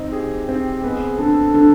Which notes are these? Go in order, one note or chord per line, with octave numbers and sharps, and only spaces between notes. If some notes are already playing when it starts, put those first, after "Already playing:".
Already playing: C4 D#4
G4 G#4
C4
B3 G#4
D3 A4
D3